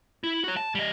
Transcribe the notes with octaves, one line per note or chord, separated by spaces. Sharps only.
E4
F#4 C#5
A5
G3 D#5